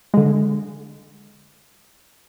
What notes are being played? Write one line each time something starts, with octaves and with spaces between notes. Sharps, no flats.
D3 G#3